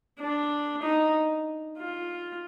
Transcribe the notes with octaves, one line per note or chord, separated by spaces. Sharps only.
D4
D#4
F4